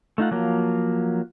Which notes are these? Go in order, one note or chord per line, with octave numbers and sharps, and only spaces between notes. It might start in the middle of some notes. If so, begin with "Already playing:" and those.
A3 D#4 F4 F#5
F3 F#3 A#3